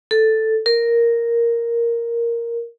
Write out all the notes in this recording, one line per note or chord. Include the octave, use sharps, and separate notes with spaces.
A4
A#4